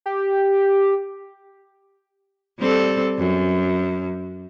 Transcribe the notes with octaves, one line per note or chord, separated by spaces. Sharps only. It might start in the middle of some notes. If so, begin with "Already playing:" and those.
G4
G3 C4 A4
F#2